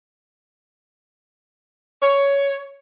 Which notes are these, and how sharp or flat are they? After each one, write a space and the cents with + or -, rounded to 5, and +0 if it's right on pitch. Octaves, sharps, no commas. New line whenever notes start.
C#5 +10